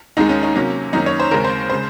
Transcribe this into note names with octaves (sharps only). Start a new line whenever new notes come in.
D#2 D#3 G#3 D#4
C#4
D#4
C3 F#3 A#3 C#4
F#2 D#3 A#3 C#4 D#4
C#5
C5
D#2 C#3 G#3 C4 A#4
C5
C#3 G#3 C5